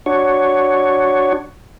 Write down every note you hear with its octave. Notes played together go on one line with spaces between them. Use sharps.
D4 F#4 C#5